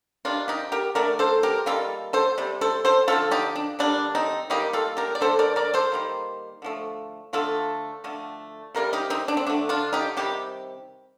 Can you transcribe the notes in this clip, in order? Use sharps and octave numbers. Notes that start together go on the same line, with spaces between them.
C3 D#3 G3 A#3 D4 F4
D#4 G4
G4 A#4
D3 A3 A#4 D5
A4 C5
G4 A#4
D#3 G3 A#3 F4 A4
A4 C5
C3 G3
A4 C5
A4 C5
D3 F3 A3 F4 A4
D#4 G4
D4
D3 G3 A#3 D4
C4 D#4
D#3 G3 A#3 D#4 G4
F4 A4
G4 A#4
D5
D3 A3 A4 C5
A#4 D5
A#4 D5
A4 C5
D#3 G3 A#3
D3 F3 A3
D3 F3 A3 F4 A4
D3 F3 A3
C3 G3 A#3 A#4
D#4 G4
C4 D#4
D4
C4
D3 A3 D4
D4 F4
D#4 G4
C3 D#3 G3 G4